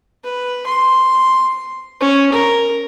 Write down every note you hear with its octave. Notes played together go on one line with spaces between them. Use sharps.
B4
C6
C#4
A#4